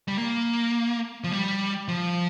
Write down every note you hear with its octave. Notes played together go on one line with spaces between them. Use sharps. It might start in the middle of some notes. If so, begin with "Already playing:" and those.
G3
A#3
F3
G3
F3